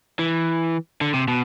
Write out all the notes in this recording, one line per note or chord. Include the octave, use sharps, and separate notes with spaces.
E3
D3
C3
B2